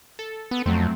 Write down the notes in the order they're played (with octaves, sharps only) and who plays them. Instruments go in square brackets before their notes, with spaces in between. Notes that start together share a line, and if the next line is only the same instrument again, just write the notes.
[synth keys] A4
[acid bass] B3
[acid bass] F2 [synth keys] F#3 A3 C4